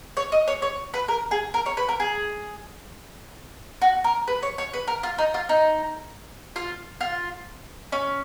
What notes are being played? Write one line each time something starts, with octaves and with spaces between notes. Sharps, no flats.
C#5
D#5
C#5
C#5
B4
A#4
G#4
A#4
C#5
B4
A#4
G#4
F#4
A#4
B4
C#5
C#5
B4
A#4
F4
D#4
F4
D#4
F4
F4
C#4